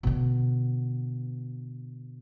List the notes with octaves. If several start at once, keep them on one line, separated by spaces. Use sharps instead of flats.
B2 D3